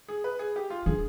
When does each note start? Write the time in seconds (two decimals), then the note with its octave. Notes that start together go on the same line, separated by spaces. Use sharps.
0.09 G#4
0.24 B4
0.39 G#4
0.56 G4
0.70 F4
0.86 D3 G#4